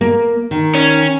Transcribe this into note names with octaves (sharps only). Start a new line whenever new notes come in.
A#3
D#3
C#4